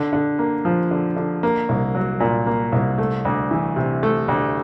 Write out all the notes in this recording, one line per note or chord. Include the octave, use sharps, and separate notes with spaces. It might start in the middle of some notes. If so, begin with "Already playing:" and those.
Already playing: D3
D3
A#3
F3
D3
D3
A#3
C2
F#3
A#2
A#3
C2
A3
D2
E3
C3
A3
D2